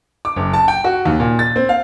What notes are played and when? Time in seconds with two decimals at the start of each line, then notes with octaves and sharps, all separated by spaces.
0.25 D6
0.36 F#1
0.53 A5
0.68 G5
0.84 F#4
1.05 D#2
1.20 A#2
1.39 A6
1.56 C4
1.69 F5